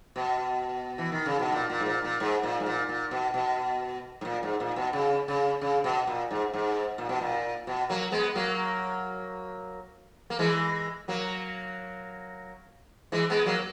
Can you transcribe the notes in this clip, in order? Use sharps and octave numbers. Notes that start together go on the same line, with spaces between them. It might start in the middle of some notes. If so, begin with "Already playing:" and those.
B2
E3
D#3
C#3
B2
A#2
A#2
G#2
A#2
A#2
G#2
A#2
G#2
A#2
A#2
B2
B2
G#2
A#2
G#2
A#2
B2
C#3
C#3
C#3
B2
A#2
G#2
G#2
A#2
B2
A#2
B2
F#3 A#3
G#3 B3
F#3 A#3
A#3
E3 G#3
F#3 A#3
E3 G#3
G#3 B3
F#3 A#3